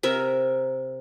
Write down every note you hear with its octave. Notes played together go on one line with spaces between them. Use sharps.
C3 A#4 E5